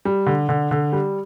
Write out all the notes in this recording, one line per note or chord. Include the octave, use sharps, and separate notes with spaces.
G3
D3
D3
D3
G3